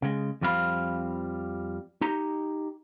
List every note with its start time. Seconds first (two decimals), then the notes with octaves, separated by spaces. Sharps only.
0.02 C#3 G#3
0.41 F2 F3 G3 C4 F5 B5
2.01 D#4 G4 A#5